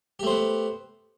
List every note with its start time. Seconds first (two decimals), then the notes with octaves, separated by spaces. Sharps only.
0.19 G4
0.23 A3
0.27 C5
0.30 B3